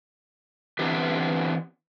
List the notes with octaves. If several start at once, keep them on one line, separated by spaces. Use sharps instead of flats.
D3 E3 B3 C4 G4